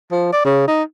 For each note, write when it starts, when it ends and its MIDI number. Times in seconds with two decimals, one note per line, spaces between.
0.11 0.32 53
0.32 0.45 74
0.45 0.67 49
0.68 0.83 63